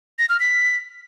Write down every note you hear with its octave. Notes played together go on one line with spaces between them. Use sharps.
A#6
F6
B6